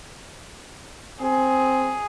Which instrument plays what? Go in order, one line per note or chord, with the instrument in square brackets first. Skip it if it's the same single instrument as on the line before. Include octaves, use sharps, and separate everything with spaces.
[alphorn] C4 [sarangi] G#4